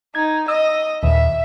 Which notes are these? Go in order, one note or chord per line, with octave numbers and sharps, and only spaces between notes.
D#4 G#6
D#5 E6
D#2 A#2 E5